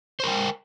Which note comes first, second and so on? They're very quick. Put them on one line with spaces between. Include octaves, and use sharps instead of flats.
C5 A#4 G5